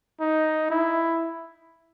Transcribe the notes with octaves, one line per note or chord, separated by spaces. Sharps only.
D#4
E4